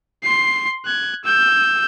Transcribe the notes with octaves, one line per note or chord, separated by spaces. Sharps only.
C6 C7
F#6 G#6
E6 G6